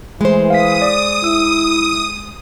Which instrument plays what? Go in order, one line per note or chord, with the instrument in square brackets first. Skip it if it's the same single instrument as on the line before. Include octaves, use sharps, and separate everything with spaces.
[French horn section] E3 [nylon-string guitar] G#3 C5 [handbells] A3
[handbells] F5 B6 [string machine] D#6
[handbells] D5
[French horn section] E4 [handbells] E6